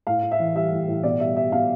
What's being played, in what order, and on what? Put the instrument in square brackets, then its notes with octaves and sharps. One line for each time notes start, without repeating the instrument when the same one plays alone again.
[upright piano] A2 F5
A2
E5
E3
G3 E5
A2
A2
B2 D5
G3 E5
G3 E5
B2 F5